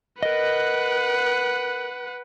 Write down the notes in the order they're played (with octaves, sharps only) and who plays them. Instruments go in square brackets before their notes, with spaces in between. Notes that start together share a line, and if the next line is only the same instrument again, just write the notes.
[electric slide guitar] A#4 D#5 [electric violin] B4 F#5